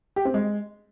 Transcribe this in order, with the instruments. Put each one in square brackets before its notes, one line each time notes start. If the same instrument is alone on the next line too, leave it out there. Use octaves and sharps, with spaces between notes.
[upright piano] G4
C4
G#3